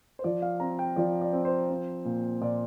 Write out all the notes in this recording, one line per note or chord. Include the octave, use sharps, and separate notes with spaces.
C5
F3 D5
F5
C4 A#5
G5
F3 D5
D5
C4
C5
C4
A#2
A#2 D5